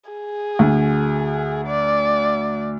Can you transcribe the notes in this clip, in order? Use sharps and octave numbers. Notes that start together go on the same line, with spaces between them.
G#4
D2
D5